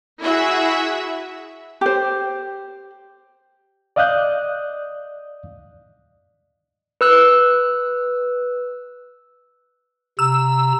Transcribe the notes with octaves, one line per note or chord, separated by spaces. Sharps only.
E4 F#4 G#4 E5
G4 C5
D5 D#5 F5 D#6 F#6 G6
B4 E6 F#6
C3 A#5 E6